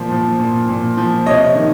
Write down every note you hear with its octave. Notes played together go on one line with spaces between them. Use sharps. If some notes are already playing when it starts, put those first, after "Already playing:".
Already playing: A#2 F3
F3
A#2
A#2
F3
C3 C#5 D#5
D#3